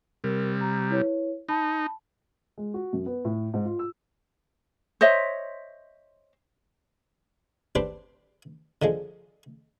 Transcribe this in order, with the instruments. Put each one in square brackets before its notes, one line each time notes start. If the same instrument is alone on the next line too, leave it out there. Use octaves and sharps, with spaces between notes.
[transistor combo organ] C3 G3 [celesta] A#4
[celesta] A#5
E4 B4 C#5
[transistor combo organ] D#4 [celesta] A5 B5
[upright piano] G#3
F#4
F#2
B3
A2
G#2
F4
E6
[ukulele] C5 C#5 D#5 E5
[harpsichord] C4 D4 G4 B4 C5
D3 F3 G#3